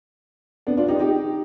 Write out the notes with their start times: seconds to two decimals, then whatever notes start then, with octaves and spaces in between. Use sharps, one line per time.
0.67 B3 D4
0.77 D4 F4
0.89 D#4 G4
0.99 D#4 G4